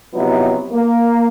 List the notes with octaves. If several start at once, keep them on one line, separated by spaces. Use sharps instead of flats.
C3 F3 F#3 B3 D#4 E4
A#3